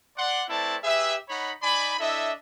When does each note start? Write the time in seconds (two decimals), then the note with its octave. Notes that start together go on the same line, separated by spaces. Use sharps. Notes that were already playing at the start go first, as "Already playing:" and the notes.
0.17 D5 F#5 C6
0.49 A3 C4 E4 B4 D5 A5
0.84 G4 G#4 B4 E5
1.29 D#4 C#5 F#5 B5
1.63 D#4 D5 G#5 B5
1.99 D4 E4 A4 D#5 E5